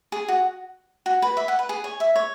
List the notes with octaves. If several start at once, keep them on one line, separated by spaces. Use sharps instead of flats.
G#4
F#4
F#4
B4
E5
F#5
B4
G#4
C#5
E5
C#5